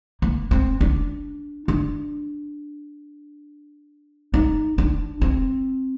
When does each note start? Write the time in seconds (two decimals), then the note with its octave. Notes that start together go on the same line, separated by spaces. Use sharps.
0.22 A#3
0.51 C4
0.81 D4
1.68 D4
4.34 D#4
4.78 D4
5.21 C4